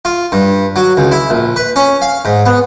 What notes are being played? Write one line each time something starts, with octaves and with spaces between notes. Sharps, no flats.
F4
G2
F#3
C#2
E4
A#1
B4
C#4
F5
G#2
B3